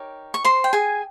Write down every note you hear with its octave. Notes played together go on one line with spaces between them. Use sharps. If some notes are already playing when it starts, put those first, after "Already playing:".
Already playing: D#4 G4 A#4 C#5
C#6
C5 C6
G5
G#4 G#5